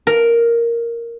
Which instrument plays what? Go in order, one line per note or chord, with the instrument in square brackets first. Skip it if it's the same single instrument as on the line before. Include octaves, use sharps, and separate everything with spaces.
[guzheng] A#4